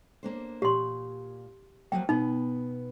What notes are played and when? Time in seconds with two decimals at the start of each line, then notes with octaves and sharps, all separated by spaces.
0.23 A#3 D4 C5
0.62 A#2 G4 C6
1.92 F3 F#3 A#3 G5
2.09 B2 B3 D#4